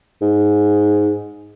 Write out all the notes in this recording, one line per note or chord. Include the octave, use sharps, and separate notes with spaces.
G#2